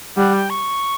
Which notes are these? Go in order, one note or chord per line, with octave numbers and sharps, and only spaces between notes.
G3 F#5
G5
C#6